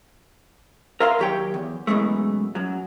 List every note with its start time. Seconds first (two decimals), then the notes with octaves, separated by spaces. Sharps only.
1.00 A#4 E5 F5 A#5 C6
1.19 D#2 F#3 G4 C#5 G5
1.54 E2
1.87 F#2 B2 E3 G#3 A3
2.55 F#2 F#3